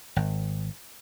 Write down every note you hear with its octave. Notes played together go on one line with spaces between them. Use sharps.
G#1